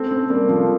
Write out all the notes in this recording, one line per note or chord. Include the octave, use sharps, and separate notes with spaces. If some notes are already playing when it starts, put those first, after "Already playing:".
Already playing: A3 C4
A3 C4
G3 A#3
F3 A3